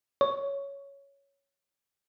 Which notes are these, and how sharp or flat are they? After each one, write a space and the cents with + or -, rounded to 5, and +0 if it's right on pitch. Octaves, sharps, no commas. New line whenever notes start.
C#5 +5